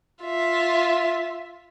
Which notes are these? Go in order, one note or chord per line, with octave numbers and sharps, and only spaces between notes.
F4 E5